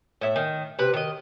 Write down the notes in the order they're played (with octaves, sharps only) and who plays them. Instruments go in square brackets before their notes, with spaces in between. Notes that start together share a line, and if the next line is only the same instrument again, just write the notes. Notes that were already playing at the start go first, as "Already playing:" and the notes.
[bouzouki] A2 E5
D#3
C3 B4
D#3 D#5